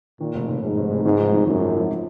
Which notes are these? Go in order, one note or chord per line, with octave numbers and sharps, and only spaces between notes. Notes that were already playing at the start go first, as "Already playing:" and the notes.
A#2 D#3
F1
F1
F1 G#2
F1
F1
G#1 G#2
F3
G#1
G#1 F#2
F3
F3